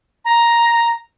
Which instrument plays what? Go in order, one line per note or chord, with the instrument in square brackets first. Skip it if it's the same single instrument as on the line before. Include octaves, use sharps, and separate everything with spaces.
[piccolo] A#5